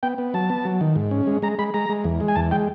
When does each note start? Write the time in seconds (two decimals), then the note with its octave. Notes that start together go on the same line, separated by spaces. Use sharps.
0.03 B3 G5
0.18 B3
0.34 F#3 A5
0.50 B3
0.65 F#3
0.81 D#3
0.96 G#2
1.11 C#4
1.27 G#3
1.42 G#3 A#5
1.59 G#3 B5
1.74 G#3 A#5
1.89 G#3
2.04 E2
2.20 G#3
2.28 G#5
2.36 E2 A5
2.51 G#3 G5